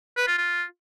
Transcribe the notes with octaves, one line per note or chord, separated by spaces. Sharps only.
B4
F4
F4